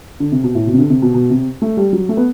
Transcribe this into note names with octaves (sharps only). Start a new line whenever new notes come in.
D3
C3
B2
A2
B2
C3
D3
C3
B2
B2
C3
A3
G3
F#3
A3
B3